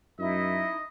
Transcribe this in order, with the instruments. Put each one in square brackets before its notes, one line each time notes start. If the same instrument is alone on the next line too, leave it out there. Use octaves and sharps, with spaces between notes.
[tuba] F#2 [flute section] D#4 E4 [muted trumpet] D#5